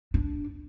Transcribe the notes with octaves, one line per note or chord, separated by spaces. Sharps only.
D4